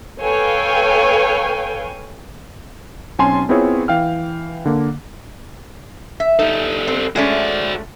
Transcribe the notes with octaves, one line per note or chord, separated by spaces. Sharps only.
A4 B4 C#5 F5 G5 G#5
B1 C4 C#4 G#5 A5 C6
B3 C4 E4 F4 G#4 C#5
E3 F5 G5 F6
D3 A#3
E5
G3 D#4 A4
C4
G#3 A3 C#4 F#4 D5